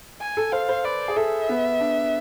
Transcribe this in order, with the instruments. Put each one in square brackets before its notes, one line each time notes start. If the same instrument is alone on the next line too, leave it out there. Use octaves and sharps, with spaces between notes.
[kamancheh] G#5
[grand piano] A4
[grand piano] C5 [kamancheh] F5
[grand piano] C5
[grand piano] B4 [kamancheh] D5
[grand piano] G#4
[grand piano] A4 [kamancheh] E5
[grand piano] B3
D4